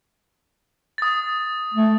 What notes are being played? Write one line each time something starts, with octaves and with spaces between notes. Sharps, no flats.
D#6 A6
A3